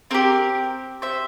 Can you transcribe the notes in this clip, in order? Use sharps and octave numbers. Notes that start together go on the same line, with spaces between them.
C4 G4 A#4
C5 E5